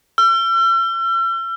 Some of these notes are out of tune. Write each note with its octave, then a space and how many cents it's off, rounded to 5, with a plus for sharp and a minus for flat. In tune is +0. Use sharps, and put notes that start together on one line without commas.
E6 +45